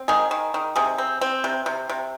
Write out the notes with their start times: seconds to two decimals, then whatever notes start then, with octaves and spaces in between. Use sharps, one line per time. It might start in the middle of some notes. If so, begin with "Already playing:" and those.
Already playing: C4
0.08 D#3 G#4
0.31 D#3
0.54 D#3
0.76 C3 G#4
0.98 C4
1.21 C4
1.44 C3
1.66 C3
1.89 C3